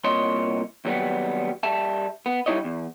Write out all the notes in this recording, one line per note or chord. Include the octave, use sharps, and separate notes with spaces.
C2 A#2 C#5 D#5 C6
D#2 F#3 G3 B3
G3 E5 A5
B3
G3 D#4 E4 C#5 D#5
E2